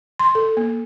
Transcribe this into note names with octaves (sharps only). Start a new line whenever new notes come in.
C6
A4
A#3